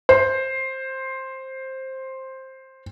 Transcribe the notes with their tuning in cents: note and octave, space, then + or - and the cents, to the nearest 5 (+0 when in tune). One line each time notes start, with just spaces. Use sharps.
C5 +10